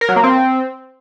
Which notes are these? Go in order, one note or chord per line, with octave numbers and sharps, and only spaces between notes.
A#4
F#3
A#3
C4